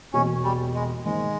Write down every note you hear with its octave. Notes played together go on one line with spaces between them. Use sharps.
E1 E2 B2 A#3 C#4
G3
G#3
G#2 D#3 G#3 A#3 D#4